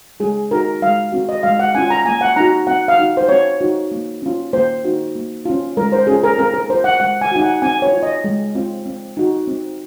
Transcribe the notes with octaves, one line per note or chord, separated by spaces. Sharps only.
G#3 G#4
D#4 F#4 A#4
G#3 F5
C4 F#4
D#5
G#3 F5
F#5
C#4 F4 G#5
A#5
A#3 G#5
F#5
D#4 F#4 A#5
C4 F#5
F5
D#4 F#4
C5
C4 C#5
D#4 F#4
A#3
C#4 F4
A#3 C5
D#4 F#4
A#3
C#4 F4
G#3 A#4
C5
C#4 F4 G#4
A#4
C4 A#4
A#4
F4 C5
F#5
G#3 F#5
G#5
D#4 F#4 G#5
F#5
C4 G#5
C#5
F4
D#5
G#3
C4 F4
C4
D#4 F#4
C4